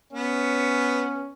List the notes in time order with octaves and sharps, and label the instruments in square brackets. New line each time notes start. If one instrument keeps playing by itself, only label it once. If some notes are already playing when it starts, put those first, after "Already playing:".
[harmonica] B3 [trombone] C#4